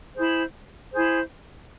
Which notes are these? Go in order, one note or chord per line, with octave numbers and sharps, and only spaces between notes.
E4 G#4 C5
E4 G#4 C5